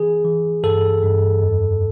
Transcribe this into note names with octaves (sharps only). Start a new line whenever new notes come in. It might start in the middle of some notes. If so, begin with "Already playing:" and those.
Already playing: E3 G#4
E3
G2 A4
G2
F2